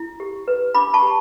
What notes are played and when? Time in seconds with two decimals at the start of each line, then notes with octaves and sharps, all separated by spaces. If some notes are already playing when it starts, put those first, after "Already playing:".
Already playing: E4
0.20 G4
0.48 B4
0.74 D4 B5 D6
0.94 A5 C#6
1.03 G4